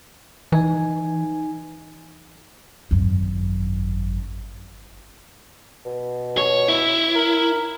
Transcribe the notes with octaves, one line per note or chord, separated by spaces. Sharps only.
E3 D#4 G#5
G#1 F#2
B2
C#5
E4
A#4